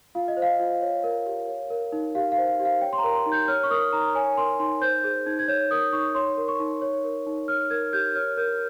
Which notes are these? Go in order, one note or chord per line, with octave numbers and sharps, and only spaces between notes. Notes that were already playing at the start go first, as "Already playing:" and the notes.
F4 F5
D#5
C5
F5
F4
C#5
A#4
G4
C#5
A#4
D#4
G4 F5
F5
C5
F5
G4
F5
C#5 G5
C6
A#5
A#4
C6
D#4
G6
C#5 F6
C#6
A#4 D#6
D#4 A#5
C#5 G#5
A#4 C6
D#4 C6
C5 G6
G#4 G6
D#4 G#6
G#6
C#5 G6
A#4 D#6
D#4 C#6
C#5 C6
A#4
C#6
D#4
C#5
A#4
D#4
C#5 F6
A#4 G#6
G4 G6
C#5 F6
A#4 G6